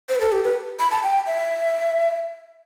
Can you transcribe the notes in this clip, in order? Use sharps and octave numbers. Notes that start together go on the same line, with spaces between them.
C5
B4
A4
G4
B4
B5
A5
G5
E5